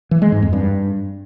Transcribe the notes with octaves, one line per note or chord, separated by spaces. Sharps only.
E3
G#3
G#2
F2
G2